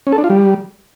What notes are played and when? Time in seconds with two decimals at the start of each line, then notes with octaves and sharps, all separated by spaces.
0.07 C#4
0.12 A4
0.18 D4
0.24 F4
0.30 G3